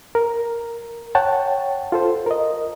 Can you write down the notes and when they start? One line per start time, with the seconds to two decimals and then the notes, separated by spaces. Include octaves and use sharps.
0.15 A#4
1.15 C#5 F#5 G5 A5
1.92 F4 A4 C5
2.26 A#4 D#5